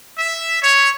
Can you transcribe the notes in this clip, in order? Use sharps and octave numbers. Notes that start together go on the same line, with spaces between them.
E5
C#5